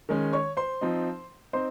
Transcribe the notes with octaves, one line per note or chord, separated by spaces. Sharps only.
D#3 G#3 C#4
C#5 C#6
C5 C6
F3 C4 D#4
C4 D#4 C5 C6